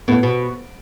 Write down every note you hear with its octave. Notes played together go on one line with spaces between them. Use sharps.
A2 B3
B2